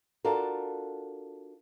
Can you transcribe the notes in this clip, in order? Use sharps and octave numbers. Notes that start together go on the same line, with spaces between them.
D4 F4 F#4 A4 A#4